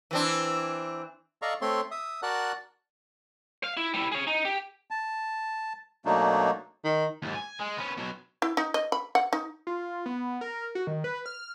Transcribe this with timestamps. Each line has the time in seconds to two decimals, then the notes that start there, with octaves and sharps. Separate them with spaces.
0.11 E3 C4 D4
1.42 A4 D5 D#5 F5 A#5 C#6
1.61 A3 C4 A4 C#5 C6
1.91 E5 D#6
2.22 F#4 A#4 D5 F#5 A5 F#6
3.64 F5
3.77 E4
3.94 G3 E4
4.12 G#4 C#5
4.27 D#4
4.45 G4
4.91 A5
6.05 B2 F#3 A3 A#3 D4 D#4
6.84 D#3
7.22 D#2 G#2
7.35 G#5
7.60 G#3
7.78 B3 C#4
7.98 B2 F#3
8.42 E4
8.57 D#4
8.74 D#5
8.92 B5
9.15 F#5
9.33 D#4
9.67 F4
10.06 B3
10.41 A#4
10.75 F#4
10.87 D#3
11.04 B4
11.26 F6